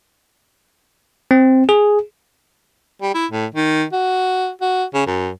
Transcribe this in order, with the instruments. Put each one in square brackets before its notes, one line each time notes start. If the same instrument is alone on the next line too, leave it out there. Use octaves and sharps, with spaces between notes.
[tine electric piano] C4
G#4
[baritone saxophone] G3
E4
A2
D#3
F#4
F#4
C#3
F#2